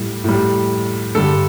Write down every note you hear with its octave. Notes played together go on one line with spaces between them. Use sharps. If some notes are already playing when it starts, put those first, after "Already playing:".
Already playing: A2 G3
A2 G3
G2 D3 G3 A4